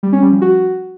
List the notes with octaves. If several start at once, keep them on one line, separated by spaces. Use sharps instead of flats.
G3
C#4
G3
F3
F#4